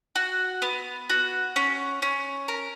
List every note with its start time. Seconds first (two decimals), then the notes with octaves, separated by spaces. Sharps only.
0.16 F#4
0.62 B3
1.10 F#4
1.56 C#4
2.02 C#4
2.48 A#4